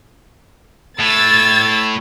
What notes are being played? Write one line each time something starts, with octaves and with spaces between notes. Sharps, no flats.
A2 E6 G#6 A6